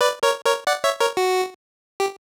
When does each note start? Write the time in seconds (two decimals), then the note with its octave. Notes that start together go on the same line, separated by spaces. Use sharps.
0.01 B4 D5
0.23 A#4 C#5
0.45 A#4 C#5
0.67 D5 F#5
0.84 C#5 E5
1.00 A#4 C#5
1.17 F#4
2.00 G4